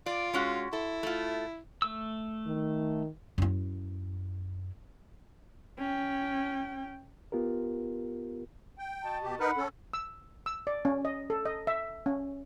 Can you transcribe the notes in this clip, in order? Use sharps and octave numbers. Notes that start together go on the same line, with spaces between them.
F4 D5
G#3 C#4 F#4
E4 A4
A3 F4
A3 E6
D#3
F#2 E4
C#4 G5
B3 F4 G4 A#4
G5
F#4 D#5 A5
B2 G4
D#4 A#4 B4 F#5 B5
C#4 A4
E6
E6
D5
C#4
D#5
A4
D#5
E5
C#4